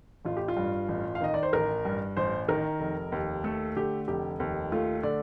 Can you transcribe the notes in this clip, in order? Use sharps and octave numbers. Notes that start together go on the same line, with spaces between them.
A1 F4
G4
F4
G2
A1
F5
D#3 D#5
D5
C5
A1 A#4
G2
A1 C5
D#3 A#4
F1
D#2
A3 A4
D3 G4
F1 G4
D#2
A3 F4
D3 D5